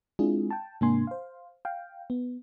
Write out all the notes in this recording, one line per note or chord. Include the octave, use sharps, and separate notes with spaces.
G#3 C4 D4 E4 F4 G#4
G5 A5
G#2 C3 A#3 D4 G#5 C6
C5 F5
F5 G5
B3